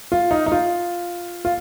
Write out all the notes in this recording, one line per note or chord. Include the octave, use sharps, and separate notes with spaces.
F4
D#4
D#4
F4
F4